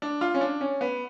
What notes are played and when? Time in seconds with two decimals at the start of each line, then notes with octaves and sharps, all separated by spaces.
0.02 D4
0.21 F4
0.34 C#4
0.41 D4
0.61 C#4
0.81 B3